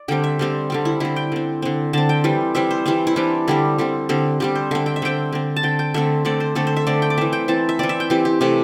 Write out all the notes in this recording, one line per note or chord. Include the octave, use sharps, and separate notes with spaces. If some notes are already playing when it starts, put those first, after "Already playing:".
Already playing: D5
D3 G3 C4 G5
E5
D3 G3 C4
D3 G3 C4
E4
D3 C4 E4
G5
D3 C4
D3 C4
D3 C4 A5
G5
E3 G3 C4
E3 G3 C4 E5
C5
E3 G3 C4 C5
E4
E3 G3 C4 D4
D3 G3 C4 E4
D3 G3 C4
D3 G3 C4
D3 G3 C4 G4
C5
D3 C4 E5
G5
E5
D3 C4 G5
D3 C4
A5
D3 C4 G5
G5
D3 A3 C4 E5
D3 A3 C4 D5
C5
D3 A3 C4 A4
C5
E5
D3 A3 C4 D5
G5
D5
E3 C4 E5
G5
E3 C4 A5
E5
E3 C4 D5
E5
G5
E3 C4 G4
G4
C3 E3 A3 G4